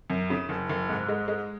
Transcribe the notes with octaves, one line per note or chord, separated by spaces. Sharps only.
F#2
C#3
F#1
F#1
G#2
G#3
G#3